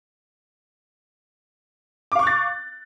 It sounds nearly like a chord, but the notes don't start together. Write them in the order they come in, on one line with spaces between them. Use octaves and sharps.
D6 F5 C#6 F#6 A6